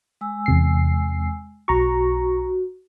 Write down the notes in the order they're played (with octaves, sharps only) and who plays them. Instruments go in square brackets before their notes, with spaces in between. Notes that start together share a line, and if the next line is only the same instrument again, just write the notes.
[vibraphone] G#3 G#5 E6
[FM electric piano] E2 C3 C7
[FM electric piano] B1 A#5 C#6 [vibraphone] F#4